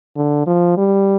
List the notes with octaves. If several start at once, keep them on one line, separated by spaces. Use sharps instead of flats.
D3
F3
G3